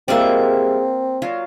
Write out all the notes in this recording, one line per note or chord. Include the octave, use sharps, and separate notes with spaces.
G3 G#3 A#3 C4 F4 D5 E5
F#3 F4